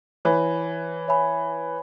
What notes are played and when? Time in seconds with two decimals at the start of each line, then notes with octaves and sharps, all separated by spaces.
0.25 E3 C#5 E5 G#5 B5
1.08 C#5 E5 G#5 B5